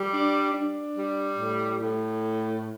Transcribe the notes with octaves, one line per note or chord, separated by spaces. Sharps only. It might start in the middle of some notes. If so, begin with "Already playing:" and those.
Already playing: G3
D4
D4
G3
A2
A2